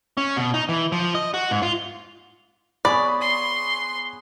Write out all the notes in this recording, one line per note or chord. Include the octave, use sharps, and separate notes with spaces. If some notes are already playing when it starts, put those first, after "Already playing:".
C#4
B2
D#4
E3
F3
D#5
F#4
G#2
F4
B3 G#4 C#5 D5 B5
C6